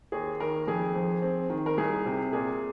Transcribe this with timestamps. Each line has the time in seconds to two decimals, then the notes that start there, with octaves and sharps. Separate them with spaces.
0.12 D#2 G#4
0.40 D#3 A#4
0.67 F2 G#4
0.96 F3
1.22 C4
1.50 D#3
1.66 A#4
1.77 C2 G#4
2.05 C3
2.33 A#2 G#4